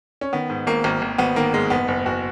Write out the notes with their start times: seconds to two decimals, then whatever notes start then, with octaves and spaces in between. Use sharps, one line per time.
0.21 C#4
0.33 D#3 B3
0.49 G#2
0.67 G#1 A#3
0.84 G#1 A#3
1.02 G#1
1.18 G#1 B3
1.36 D#3 A#3
1.54 G#2 G#3
1.70 F#1 B3
1.88 F#1
2.06 F#1 F#4